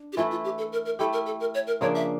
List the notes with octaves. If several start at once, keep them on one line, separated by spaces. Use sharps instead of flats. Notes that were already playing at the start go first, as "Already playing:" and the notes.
Already playing: D4
G4
E3 A3 E4 F4
F4
G4
A4
A#4
A#4
A3 E4 G4 A4
A#4
A4
A#4
C#5
A#4
C#3 F3 A#3 D4 C#5
E5